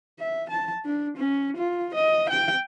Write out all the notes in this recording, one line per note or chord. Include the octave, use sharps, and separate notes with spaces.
E5
A5
D4
C#4
F4
D#5
G5